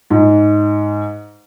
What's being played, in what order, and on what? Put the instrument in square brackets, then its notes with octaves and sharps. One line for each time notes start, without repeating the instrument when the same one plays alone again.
[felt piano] G#2